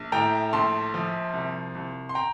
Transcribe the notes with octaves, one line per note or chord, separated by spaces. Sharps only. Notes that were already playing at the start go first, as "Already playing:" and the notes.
Already playing: A#1
A2 G5 A#5
A#1 A5 C6
F3
C2
C2
C6
G5 A#5